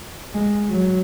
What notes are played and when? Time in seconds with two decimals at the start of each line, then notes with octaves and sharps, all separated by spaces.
0.34 G#3
0.70 F#3